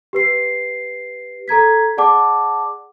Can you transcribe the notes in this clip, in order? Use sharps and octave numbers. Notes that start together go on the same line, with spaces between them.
G4 B4 C7
A4 A#5 G#6 B6
G#4 D5 F#5 A5 D6